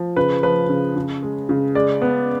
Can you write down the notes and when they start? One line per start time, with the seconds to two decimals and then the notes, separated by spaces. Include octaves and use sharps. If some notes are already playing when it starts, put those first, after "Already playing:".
Already playing: F3
0.16 C#3 B4
0.43 F3 B4
0.69 C#3
0.96 C#3
1.23 G#3
1.49 C#3
1.75 G#3 D5
2.02 B3